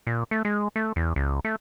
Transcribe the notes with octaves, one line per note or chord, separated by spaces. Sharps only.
A#2
A3
G#3
A3
E2
C#2
A3